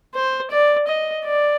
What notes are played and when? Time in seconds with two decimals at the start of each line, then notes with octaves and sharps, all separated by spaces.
0.14 C5
0.51 D5
0.88 D#5
1.25 D5